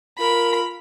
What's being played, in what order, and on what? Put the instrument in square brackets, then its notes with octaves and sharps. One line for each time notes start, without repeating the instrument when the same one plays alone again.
[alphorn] F4 [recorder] A#4 [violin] B5